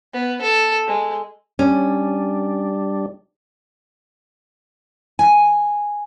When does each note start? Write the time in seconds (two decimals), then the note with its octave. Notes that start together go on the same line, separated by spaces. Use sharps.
0.13 B3
0.42 A4
0.87 G#3
1.59 G3 C#4 D4
5.19 G#5